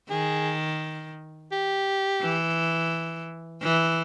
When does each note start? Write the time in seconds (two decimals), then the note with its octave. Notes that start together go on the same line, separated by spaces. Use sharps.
0.10 D#3 G#4
1.52 G4
2.22 E3
3.62 E3